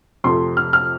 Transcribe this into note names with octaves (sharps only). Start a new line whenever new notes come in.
F2 C3 F3 A3 C6
F6
F6